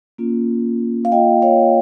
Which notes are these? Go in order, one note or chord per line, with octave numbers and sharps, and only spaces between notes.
A#3 C#4 F4
F5
A#3 F4 D#5 G5
C#5 F5